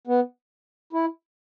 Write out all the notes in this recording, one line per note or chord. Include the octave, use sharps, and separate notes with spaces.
B3
E4